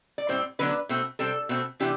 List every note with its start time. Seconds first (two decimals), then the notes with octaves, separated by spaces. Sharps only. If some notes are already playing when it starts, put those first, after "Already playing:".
0.18 D5
0.29 A2 G3 C4 C5
0.59 D3 F#3 B3 D4 B4
0.89 B2 A3 C4
1.19 C3 G3 C4 A4
1.49 B2 A3 C4
1.80 C3 E3 B3 D4 G4